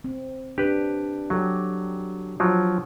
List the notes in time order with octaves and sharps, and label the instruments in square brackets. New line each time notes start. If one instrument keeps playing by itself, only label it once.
[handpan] C4
[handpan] D4 [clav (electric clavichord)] G4 B4
[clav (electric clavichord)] F#3 [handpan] G4 A4
[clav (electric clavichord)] F3 F#3